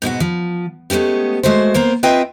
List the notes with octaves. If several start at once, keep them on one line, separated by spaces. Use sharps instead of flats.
G#2 B2 G#3 F#4
F3
G#3 A3 B3 C#4 G4
G#3 A3 F#4 C5
A#3 B3 C5
C4 F4 B4 D#5 E5 G5